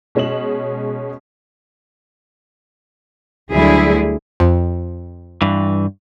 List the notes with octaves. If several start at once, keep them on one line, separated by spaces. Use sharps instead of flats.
B2 G#3 C#4 D#5 E7 F#7
D2 D3 F#3 G3 E4 G#4
F2
G2 E3